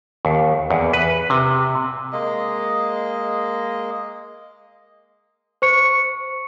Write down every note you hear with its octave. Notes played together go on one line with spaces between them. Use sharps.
D#2
E2
B4
C3
G#3 A#3 D#5
C5 C#6 C#7